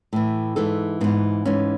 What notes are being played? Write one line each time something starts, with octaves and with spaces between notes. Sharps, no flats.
A2 E3
G#2 E3 A4
G#2 E3 B3
G#2 E3 C#4